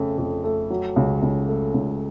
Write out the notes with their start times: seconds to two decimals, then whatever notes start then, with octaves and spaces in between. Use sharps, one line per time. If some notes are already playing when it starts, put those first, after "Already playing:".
Already playing: F2 C#3 A3
0.18 F2
0.44 A3
0.70 F#3
0.96 C#2
1.22 C#2
1.49 A3
1.74 C#2